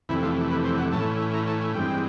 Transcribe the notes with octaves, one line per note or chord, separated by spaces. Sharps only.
F2 C3 E3 A3 E4
F4
B4
C5
F#5
A2 E3 A3 C#4 A5
A#5
A5
G#5
G2 E3 G#3 C4 G5